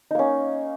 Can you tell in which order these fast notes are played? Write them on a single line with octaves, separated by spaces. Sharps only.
D#4 A#3 C#4